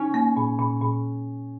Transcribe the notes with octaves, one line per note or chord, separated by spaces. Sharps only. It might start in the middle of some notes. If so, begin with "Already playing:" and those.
Already playing: C#4 D#4
A#3
A#2
A#2
A#2